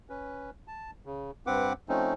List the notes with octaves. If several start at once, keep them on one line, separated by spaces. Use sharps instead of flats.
C#4 B4
A5
C#3
G2 C4 B4 F#5 D6
F3 A3 C4 C#4 D#4